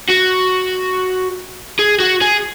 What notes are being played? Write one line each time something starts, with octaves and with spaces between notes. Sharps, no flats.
F#4
G#4
F#4
G#4